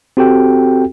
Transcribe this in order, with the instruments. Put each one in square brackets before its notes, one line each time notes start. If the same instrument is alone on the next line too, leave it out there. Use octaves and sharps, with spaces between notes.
[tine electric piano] C4 F#4 G4 A4 G5